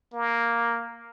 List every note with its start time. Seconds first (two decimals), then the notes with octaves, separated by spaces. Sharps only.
0.13 A#3